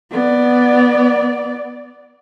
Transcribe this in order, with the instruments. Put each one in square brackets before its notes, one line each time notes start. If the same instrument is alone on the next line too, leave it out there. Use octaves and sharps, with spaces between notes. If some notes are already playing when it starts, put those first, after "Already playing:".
[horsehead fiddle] B3 D5